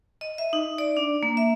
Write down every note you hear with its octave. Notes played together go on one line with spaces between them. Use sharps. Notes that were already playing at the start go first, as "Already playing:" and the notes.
D#5
E5
D#4
D5
D4
A#3
E5